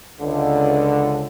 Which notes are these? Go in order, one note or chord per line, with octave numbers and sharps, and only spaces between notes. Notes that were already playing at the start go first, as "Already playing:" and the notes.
C#2 D3